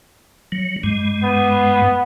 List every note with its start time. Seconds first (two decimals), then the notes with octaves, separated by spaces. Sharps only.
0.52 F#3
0.83 G2 G#3
1.24 B3